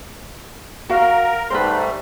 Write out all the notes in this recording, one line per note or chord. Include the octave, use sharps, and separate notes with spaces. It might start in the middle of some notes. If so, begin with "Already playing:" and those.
F#4 A#4 F5
G#2 G3 A3 B4 C5